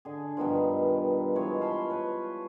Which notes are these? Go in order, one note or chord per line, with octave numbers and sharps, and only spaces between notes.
D3 G#4
G2 B2 D#3 F3
E3 F3 G#3 C#5
F5 A5 B5 C6
B4 C#5